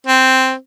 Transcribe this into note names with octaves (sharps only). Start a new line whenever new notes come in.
C4